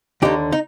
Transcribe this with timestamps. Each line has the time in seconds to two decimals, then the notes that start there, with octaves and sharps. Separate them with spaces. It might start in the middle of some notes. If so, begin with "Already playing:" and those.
0.22 D#2 D3 D#4 G4
0.52 D#4